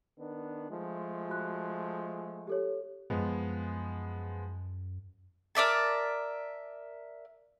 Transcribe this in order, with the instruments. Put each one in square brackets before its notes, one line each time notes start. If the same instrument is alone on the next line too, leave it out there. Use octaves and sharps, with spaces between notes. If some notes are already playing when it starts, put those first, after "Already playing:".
[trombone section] D#3 B3 D4
F3 G#3 A3
[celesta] F#4 F#6
G4 A4 C#5
[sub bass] F#2 [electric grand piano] F3 G#3 B3
[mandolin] A#4 D5 E5 A5